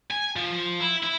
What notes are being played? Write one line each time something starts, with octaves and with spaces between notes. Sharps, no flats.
G#5
F3
E4
E4